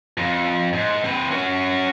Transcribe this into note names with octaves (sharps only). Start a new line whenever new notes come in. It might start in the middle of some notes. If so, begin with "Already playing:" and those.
F2
G#2
C4 B4
C#4 F#4